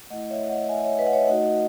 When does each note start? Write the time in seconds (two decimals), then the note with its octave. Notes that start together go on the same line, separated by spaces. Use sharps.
0.10 A3 E4 D#5 F#5
0.30 C#5 E5
0.50 D#5 F#5
0.69 E5 G#5
0.84 C#5 E5
0.99 B4 D#5
1.07 F#5
1.13 C#5 E5
1.28 A3 D#4 F#4 D#5 F#5